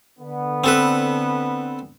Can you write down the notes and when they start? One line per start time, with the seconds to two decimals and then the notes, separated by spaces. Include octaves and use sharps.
0.19 D3 B3
0.64 C4 A4 B4